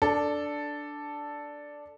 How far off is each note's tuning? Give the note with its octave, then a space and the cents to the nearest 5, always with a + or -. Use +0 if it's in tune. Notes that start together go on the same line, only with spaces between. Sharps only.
D4 +0 A4 +0